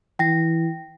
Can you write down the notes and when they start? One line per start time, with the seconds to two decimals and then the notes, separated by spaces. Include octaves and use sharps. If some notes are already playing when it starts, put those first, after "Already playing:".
0.19 E3 G5 A#6